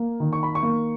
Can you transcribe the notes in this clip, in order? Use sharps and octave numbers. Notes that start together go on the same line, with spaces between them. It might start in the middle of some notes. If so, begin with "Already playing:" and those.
Already playing: A#3
D#3
C#6
B5
C#6
A#3